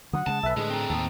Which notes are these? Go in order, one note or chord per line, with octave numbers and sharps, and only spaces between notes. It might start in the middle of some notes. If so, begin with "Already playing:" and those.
D3 F#3 F#5 D#6
C#3 F#3 G#3 A5
B1 A4 B4 E5
A2 D3 G#3 G#4
C4 D#4
D#2 A2 A5 D#6